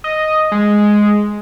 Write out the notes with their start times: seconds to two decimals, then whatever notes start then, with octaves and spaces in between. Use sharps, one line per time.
0.04 D#5
0.52 G#3